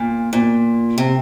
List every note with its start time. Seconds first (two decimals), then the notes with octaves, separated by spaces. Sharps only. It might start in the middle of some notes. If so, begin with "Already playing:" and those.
Already playing: A#2
0.33 A#2
0.98 C3